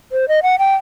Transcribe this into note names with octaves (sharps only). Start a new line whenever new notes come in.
C5
D#5
F#5
G5